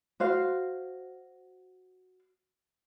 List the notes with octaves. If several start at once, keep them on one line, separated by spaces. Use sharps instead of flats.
F#4 C5 F5